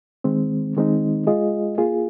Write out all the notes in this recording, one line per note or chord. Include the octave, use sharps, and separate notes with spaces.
D#3 G#3 C4
D#3 G#3 C4 D#4
G#3 F4 G#4 D#5
A#3 F4 G#4